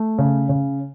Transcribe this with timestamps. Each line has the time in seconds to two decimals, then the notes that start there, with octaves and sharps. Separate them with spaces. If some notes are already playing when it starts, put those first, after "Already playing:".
Already playing: A3
0.18 C#3
0.49 C#3